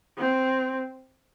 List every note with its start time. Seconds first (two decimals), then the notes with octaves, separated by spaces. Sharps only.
0.18 C4